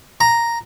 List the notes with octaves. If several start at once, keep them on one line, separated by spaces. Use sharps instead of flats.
A#5